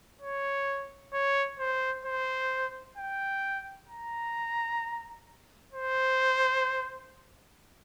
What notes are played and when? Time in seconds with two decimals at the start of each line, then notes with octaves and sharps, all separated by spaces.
0.21 C#5
1.13 C#5
1.59 C5
2.05 C5
2.98 G5
3.89 A#5
5.73 C5